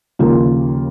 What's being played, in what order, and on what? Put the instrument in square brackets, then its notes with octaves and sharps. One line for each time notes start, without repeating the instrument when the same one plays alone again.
[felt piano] D#2 C#3 F3 A#3 F4